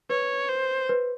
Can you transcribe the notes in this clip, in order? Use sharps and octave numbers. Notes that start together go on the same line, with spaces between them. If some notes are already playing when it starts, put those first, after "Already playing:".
B4 C#5
C5
B4